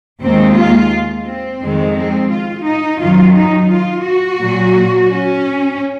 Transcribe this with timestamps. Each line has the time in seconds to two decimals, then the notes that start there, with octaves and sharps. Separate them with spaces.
0.22 D#2 D#3 G#3 C4
0.56 F4
1.26 C4
1.61 F2 D#3 G#3
1.96 C4
2.31 F4
2.65 D#4
2.99 F#2 D#3 F#3 F4
3.34 D#4
3.69 F4
4.04 F#4
4.39 A#2 F#3
5.07 C#4